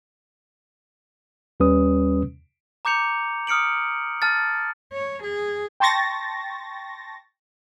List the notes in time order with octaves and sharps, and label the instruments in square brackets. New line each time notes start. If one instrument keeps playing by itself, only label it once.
[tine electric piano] D#2 G3 C#4 B4 D#6
[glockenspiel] A#5 D6 G6 C#7 F7
D#6 F6 C#7 D7 F#7
A5 F6 A6
[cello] C#5
G#4
[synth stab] G5 A5 C6 C#6 A6 A#6